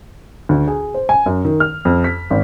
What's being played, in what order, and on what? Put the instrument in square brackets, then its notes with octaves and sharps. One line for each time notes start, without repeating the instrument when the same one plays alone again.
[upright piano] D2
G#4
C5
G#5
F#2
D#3
F6
F2
B6
G#1